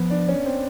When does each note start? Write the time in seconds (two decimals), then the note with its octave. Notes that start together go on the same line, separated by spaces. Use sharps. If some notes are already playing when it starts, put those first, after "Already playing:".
Already playing: F3 B3
0.10 D4
0.29 C#4
0.45 C4